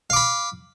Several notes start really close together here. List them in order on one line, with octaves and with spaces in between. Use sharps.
F5 D6 B5